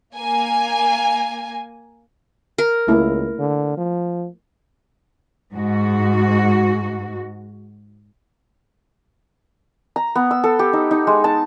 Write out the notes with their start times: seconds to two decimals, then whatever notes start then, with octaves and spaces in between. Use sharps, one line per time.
0.16 A#3 G#5
2.58 A#4
2.88 C#2 A3 A#3 E4
3.39 D3
3.77 F3
5.51 G#2 F#4
9.96 A#5
10.15 B3
10.31 E6
10.44 A4
10.59 G4
10.73 D#4
10.91 D#4
11.07 G#3
11.24 A5